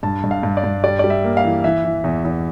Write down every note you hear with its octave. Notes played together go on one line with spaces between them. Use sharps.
G2 A5
G2
F5
G2
D5
G2
G3 D5
G3 D5
E5
A#3
F5
E3
E3 E5
E3
E2
E2